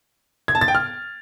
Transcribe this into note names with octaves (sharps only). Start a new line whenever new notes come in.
G#6
A5
A6
G5
F6